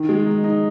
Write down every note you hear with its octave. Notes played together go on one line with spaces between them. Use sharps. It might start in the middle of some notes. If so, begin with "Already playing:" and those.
Already playing: D#3
G#3
D#4
D#4